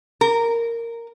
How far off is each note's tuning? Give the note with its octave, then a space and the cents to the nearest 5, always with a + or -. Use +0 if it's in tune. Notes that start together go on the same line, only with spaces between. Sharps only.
A#4 -10